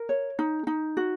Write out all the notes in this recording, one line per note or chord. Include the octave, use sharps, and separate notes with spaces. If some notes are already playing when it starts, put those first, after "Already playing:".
Already playing: A#4
C#5
D#4
D#4
F#4